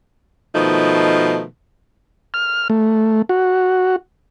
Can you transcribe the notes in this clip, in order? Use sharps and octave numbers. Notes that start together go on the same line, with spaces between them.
B2 D#3 F3 A3 D#4
F6
A3
F#4